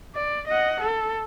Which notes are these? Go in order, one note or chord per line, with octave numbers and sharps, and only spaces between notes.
D5
D#5 F#5
A4